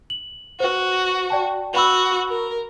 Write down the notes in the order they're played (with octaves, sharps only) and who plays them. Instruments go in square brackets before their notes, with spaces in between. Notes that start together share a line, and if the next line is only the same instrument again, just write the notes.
[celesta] F#7
[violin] F#4 [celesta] B4 C5
[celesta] D5 G5 A5
[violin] F#4 [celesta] B4 B5 E6
[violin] A#4